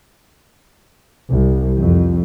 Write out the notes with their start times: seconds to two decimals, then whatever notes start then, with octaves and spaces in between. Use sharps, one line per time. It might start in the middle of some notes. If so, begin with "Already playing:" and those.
1.29 C2
1.80 F2